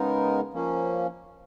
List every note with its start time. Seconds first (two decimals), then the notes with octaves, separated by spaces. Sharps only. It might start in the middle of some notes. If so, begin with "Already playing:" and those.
Already playing: C#3 G#3 B3 D#4 A#4
0.53 F3 A#3 C#4